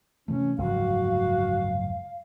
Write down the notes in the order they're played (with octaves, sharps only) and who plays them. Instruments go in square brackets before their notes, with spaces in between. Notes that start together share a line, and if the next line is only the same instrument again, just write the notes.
[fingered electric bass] C3 E3 A3 [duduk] C#4
[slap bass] F#1 G#3 [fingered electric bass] D2 G#2 F3 [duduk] F#4 [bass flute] F5